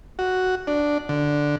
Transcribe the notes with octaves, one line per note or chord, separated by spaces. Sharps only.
F#4
D4
D3